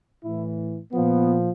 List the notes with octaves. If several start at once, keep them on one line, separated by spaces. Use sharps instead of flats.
A2 E3 E4
A#2 F3 B3